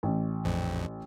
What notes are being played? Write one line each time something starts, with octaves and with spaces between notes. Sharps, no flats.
A1
A#1 F2